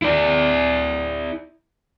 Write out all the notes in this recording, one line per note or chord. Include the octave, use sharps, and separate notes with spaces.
E4 D5